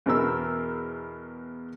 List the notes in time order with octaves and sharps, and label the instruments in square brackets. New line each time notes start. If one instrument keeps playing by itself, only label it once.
[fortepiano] E2 B2 A#4 E6